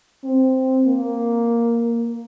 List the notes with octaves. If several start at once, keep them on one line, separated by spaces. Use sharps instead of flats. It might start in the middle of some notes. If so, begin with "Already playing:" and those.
C4
A#3